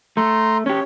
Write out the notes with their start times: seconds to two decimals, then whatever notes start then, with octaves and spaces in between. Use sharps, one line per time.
0.17 A3 A#5 C6
0.66 C#4 G4 C#5